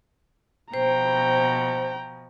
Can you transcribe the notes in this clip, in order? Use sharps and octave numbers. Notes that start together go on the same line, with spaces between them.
B2 F3 C5 G5 A#5